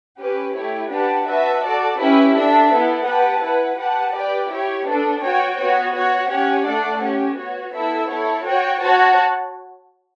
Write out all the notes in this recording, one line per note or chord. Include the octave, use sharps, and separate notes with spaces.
C#4 G4 B4
A3 E4 G4 C#5
D4 G4 B4 F#5 A5
F#4 B4 E5 A5
F#4 A4 D5 A5
C#4 E4 G4 B4 E5
D4 A4 E5
B3 E4 A4
G4 B4 F#5 A5
E4 B4 F#5
G4 B4 F#5 A5
G4 B4 D5 G5
E4 G4 C#5
B3 D4 A4
F#4 C#5 G5
B3 F#4 C#5
F#4 C#5 F#5
C#4 G4 C#5 F#5
A3 D4 A4 D5 F#5
C#4 G4 C#5
B3 F#4 C#5
B3 E4 A4 E5
E4 A4 C#5
F#4 C#5 G5
F#4 C#5 F#5 A5